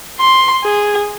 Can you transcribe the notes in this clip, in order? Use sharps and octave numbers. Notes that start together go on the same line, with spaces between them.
C6
G#4